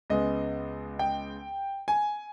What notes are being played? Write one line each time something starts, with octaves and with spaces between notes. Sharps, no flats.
C#2 C#3 G#3 B3 D#5
G5
G#5